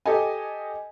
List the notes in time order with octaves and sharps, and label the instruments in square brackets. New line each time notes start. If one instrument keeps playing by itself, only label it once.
[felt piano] G4 A4 D#5 G#5